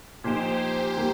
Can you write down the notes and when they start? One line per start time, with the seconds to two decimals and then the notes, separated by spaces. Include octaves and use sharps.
0.24 A#2 F3 D#4 G4 C5
0.96 D#3 G3 A#3